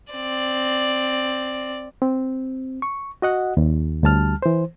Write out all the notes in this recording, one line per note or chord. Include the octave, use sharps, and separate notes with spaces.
C4 D5
C4
C#6
F#4 D#5 F#5
D#2
D2 G3 A5 F6
E3 C5